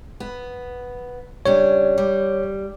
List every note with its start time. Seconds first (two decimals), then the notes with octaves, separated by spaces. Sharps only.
0.20 B3
1.46 C#3 G3 D4 C#5
1.98 G3